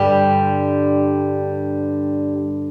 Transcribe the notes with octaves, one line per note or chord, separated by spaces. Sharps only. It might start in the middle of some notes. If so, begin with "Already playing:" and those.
Already playing: G2 D3 G3 G4